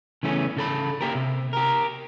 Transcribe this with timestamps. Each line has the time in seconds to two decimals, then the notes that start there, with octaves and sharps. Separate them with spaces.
0.23 C#3 E3 A3 B3 C#4
0.57 C#3 A4 B5
1.01 A#3 G4 A#4
1.15 C3
1.53 G4 A#4